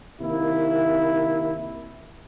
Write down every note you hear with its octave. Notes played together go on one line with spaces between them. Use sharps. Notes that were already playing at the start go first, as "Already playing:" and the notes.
C3 D#3 A#3 E4